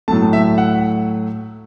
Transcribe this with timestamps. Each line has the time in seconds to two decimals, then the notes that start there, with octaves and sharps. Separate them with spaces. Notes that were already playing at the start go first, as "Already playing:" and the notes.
0.08 A2 F#3 A3 A5
0.33 E5
0.58 F#5